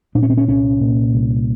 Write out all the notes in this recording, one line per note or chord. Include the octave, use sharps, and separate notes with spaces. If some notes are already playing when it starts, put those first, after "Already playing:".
A#2 D4
C#4
C4
C#4
C2 C#4
A#2
C2